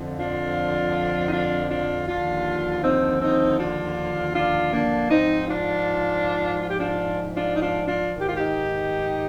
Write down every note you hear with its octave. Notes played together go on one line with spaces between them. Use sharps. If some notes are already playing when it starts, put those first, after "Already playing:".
Already playing: F2 D3 F3
D4 F4
D#4
D4 F4
D4 F4
D#2 D3 F3 D4 F4
C4 D#4
C4 D#4
D4 F4
D4 F4
A#3 D4
G#2 F3 C4 D#4
D4 F4
F4
G4
D4 F4
D4 F4
D#4
D4 F4
D4 F4
G#2 D#3
G4
F4
D#4 G4